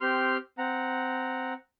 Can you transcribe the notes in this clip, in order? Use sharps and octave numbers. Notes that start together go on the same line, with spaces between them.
C4 G4 C6 F6
C4 F#5 A#5